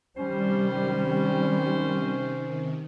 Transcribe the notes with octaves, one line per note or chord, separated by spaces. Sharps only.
C3 D#3 G3 C#4 C5